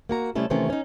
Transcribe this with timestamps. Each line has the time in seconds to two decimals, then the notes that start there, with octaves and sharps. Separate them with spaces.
0.09 A#3 F#4 A#5
0.35 C3 G3 A3 C#4 E4 A4
0.50 C3 D#3 E3 A3 C4 C#4
0.70 C#4 D#4